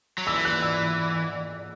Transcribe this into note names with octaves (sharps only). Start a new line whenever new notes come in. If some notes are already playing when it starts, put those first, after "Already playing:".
F#3
E3 E6
F#6
E6